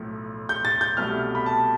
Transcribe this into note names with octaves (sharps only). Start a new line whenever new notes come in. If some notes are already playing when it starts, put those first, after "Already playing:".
Already playing: B1 A2 F3 A3
G6
A6
G6
C2 B2 A3 F6
B5
A5